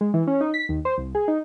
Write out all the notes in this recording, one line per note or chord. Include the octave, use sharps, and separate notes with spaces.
G#3
E3
C#4
D#4
B6
D#2
C5
C2
G#4
D#4